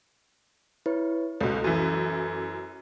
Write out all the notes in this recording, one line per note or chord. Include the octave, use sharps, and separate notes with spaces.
E4 B4 C#5
C#2 B2 A4
F#2 E3